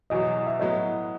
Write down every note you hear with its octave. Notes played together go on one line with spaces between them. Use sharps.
E2 B2 F#3 D#5
E5
A2 F#3 B3 D#5